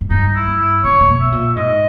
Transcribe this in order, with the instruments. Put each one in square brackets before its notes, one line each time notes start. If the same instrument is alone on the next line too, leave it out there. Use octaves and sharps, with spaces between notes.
[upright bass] G#2
[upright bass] G2 [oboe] D#4
[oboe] E4
[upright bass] G2
[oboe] E4
[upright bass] C#3 [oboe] C#5
[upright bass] C#3
B2
[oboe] E5
[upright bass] A#2
[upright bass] G#2 [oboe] D#5